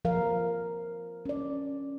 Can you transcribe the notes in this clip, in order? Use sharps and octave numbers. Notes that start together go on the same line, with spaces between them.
F3 A#4 F5
C#4 D5